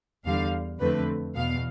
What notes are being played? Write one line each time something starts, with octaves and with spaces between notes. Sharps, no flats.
E2 D3 G3 F5
F2 D3 A3 C4 B4
E2 B2 B3 F5